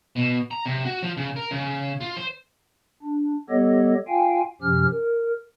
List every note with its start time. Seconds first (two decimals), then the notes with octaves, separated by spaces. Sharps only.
0.16 B2
0.51 A#5
0.66 C3
0.85 F#4
1.03 F3
1.17 C#3
1.36 A#4
1.51 C#3
2.01 F4
2.17 C5
3.03 D4
3.49 G3 B3 G4 A4 C#5 D#5
4.08 F4 F5 G5 G#5
4.61 F#2 C3 F3 C#4 G4 F6
4.91 A#4